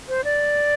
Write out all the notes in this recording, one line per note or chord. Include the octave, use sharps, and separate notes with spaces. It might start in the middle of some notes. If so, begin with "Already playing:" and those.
C5
D5